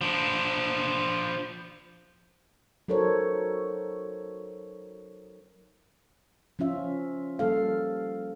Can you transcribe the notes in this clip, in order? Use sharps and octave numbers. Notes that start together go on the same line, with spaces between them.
F3 D4
F#3 D#4 A4 A#4 C5 C#5
F3 C#4 F4 E5
F3 G3 A#3 A4 F5